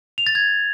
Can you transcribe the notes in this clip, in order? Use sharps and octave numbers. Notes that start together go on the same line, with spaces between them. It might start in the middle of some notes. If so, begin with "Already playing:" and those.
F7
A6
G#6